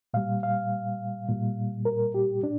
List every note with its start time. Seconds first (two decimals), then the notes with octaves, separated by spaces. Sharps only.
0.14 A#2 G3 F5
0.43 F5
1.29 A#2 G3
1.85 A#4
2.14 G4
2.42 A#2 D4